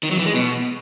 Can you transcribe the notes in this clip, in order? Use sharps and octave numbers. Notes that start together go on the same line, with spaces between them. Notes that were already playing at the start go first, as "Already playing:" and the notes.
D#3
F#3
E3
G#3
B2